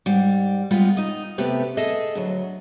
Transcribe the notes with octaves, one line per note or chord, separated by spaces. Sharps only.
G#2 G3
G3 G#3 B3 F4
D#4 D#5
C3 A3 B3 G4 B4
G#4 A4 D#5 E5
D2 F#3